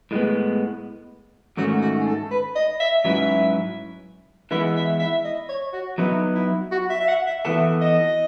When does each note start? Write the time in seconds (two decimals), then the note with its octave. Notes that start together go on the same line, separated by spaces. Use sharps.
0.11 A2 G#3 B3
1.57 G#2 D#3 A3 C#4 F#4
1.82 F#4
2.01 G#4
2.07 A4
2.31 B4
2.56 D#5
2.80 E5
3.04 G#2 F#3 C#4 E4 B4 E5
4.51 E3 G#3 B3 E4 E5
4.76 E5
5.00 E5
5.24 D#5
5.49 C#5
5.73 F#4
5.98 F#3 B3 D#4 E4
6.34 E4
6.72 F#4
6.90 E5
7.00 E5
7.08 F#5
7.27 E5
7.44 E3 B3 F#4 A4 E5
7.81 D#5